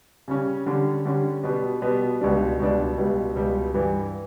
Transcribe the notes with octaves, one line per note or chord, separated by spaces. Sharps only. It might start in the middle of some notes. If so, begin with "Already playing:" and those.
C#3 G3 C#4
D3 G3 C#4
D3 G3 C#4
B2 G3 B3
B2 G3 B3
C#2 B2 G3 D4
C#2 B2 G3 D4
C#2 B2 G3
C#2 B2 G3
G2 E3 G3